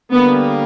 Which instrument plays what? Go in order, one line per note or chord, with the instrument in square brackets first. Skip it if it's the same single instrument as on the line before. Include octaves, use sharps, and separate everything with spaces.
[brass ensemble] D3 G3 A#3 [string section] B3